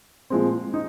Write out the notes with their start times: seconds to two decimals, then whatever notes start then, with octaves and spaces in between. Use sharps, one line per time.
0.30 A#2 F3 G#3 C4
0.74 D#4